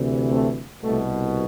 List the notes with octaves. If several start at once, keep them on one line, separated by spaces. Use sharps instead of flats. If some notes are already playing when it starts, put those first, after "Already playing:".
Already playing: D2 C3 E3
A3 C4
C2 B2 A3